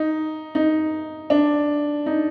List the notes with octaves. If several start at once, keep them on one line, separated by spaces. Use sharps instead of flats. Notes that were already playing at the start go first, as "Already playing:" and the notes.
Already playing: D#4
D#4
D4
D#4